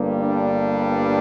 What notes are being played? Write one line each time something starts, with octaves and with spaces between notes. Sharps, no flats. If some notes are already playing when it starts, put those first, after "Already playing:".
Already playing: G1 G2 G3 A#3
D4